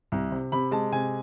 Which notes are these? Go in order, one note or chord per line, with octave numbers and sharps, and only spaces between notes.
C2
C3
C3 B5
G#3 A5
C3 G#5